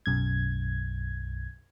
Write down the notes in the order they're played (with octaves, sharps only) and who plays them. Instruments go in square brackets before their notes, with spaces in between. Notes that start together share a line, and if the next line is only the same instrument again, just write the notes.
[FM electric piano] B1 F#2 G#6